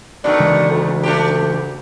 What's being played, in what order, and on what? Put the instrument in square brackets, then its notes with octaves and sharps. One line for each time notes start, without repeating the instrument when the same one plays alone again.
[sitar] B2 D#3 A3 [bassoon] D4
[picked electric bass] C#3 E3 G#3
[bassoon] D2
[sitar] A3 D4 G4